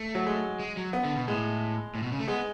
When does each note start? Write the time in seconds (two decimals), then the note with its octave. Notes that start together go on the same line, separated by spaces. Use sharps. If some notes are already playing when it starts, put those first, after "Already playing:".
Already playing: A3
0.15 F#3
0.27 G#3
0.60 G#3
0.77 F#3
0.93 B3
1.05 D3
1.17 B2
1.28 A2 G#3
1.95 A2
2.03 B2
2.12 C#3
2.19 A3
2.28 G#3 B3